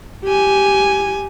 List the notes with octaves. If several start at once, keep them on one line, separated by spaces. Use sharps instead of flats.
G4 G#5